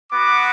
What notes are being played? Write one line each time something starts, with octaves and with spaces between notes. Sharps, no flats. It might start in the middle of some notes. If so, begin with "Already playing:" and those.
B3 F#4 D6